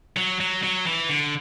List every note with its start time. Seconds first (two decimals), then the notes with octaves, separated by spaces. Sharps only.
0.17 F#3
0.40 F#3
0.63 F#3
0.87 E3
1.09 D3